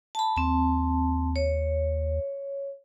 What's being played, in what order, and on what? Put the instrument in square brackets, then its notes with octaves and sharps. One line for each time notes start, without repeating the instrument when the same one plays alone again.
[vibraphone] A5 B5
[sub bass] D#2 [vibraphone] C4 A5
[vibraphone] C#5